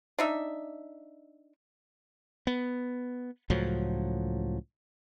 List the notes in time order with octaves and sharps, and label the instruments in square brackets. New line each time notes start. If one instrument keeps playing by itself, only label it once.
[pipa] D4 D#4 E5
[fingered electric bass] B3
C#2 A2 F3 F#3